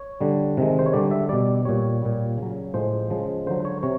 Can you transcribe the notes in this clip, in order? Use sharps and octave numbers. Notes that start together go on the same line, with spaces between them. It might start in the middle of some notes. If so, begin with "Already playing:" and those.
Already playing: C#5
D3 G3
C3 D#3 G#3
C5
C#5
D3 G3 D5
E5
B2 G3 D5
A#2 G3 C#5
A#2 G3
C#3 F#3
A2 F3 G#3 C5
C#3 F3 G#3
D3 F#3 C5
C#5
C3 C#5